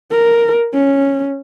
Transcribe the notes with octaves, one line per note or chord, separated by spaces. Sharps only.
A#4
C#4